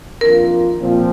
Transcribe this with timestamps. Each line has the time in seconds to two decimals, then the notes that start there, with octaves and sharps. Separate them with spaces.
0.21 F2 D#3 A#3 D4 F4 A#4
0.79 A#2 F3 C4